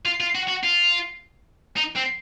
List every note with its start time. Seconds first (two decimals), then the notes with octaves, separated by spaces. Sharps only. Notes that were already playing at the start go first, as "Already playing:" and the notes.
0.05 F4
0.20 F4
0.35 F#4
0.48 F#4
0.63 F4
1.77 D#4
1.96 C4